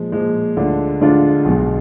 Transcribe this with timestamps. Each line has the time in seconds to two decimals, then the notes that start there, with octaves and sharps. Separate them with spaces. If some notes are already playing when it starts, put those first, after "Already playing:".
Already playing: A#2 F3 G#3
0.12 A#2 F3 G#3
0.57 D2 D3 G#3 D4 F4
1.01 D2 D3 G#3 D4 F4
1.45 B1 B2 G#3